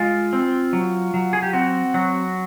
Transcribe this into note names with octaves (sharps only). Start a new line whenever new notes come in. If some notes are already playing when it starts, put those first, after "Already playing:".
Already playing: G#3 F4
C4
F#3
F#3
G#4
G4
C4 F#4
F#3